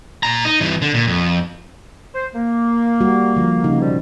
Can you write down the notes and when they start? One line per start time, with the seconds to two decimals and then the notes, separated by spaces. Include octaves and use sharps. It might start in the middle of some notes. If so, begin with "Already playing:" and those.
0.23 A#2 A#5
0.45 D#4
0.61 G2 E3
0.82 D3
0.94 A#2
1.08 F2
2.15 C5
2.34 A#3
3.01 G3 F#4
3.36 D3 F3
3.64 C#3 D#4
3.81 F2 B2 G3